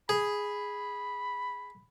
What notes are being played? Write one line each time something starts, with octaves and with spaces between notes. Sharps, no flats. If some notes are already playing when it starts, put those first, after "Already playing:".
G#4 B5